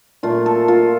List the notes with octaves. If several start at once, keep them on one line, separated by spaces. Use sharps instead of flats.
A#2 A3 F4
A4
F4